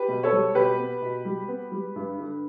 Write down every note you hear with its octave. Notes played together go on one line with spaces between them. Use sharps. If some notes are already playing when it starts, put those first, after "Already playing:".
Already playing: G4 B4
B2
A4 C#5
G3
B2 G4 B4
B3
B2
G3
B3
G3
G2
D3